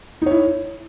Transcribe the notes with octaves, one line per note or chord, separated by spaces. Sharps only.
D#4 E4 C#5